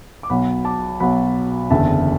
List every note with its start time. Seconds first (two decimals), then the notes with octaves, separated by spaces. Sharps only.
0.23 D6
0.30 B1 B2 F#3 F#5 B5
0.65 A5 D6
1.00 B1 B2 F#3 F#5 B5
1.70 F#1 E2 D3 E5 A5